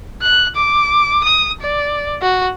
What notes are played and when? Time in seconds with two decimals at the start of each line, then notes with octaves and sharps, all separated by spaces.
0.22 F#6
0.55 D6
1.23 D#6
1.61 D5
2.22 F#4